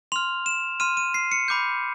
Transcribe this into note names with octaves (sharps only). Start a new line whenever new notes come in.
C6 F6 F7
E7
C6 F6 D#7
D#7
C7
C#7
B5 D6 G6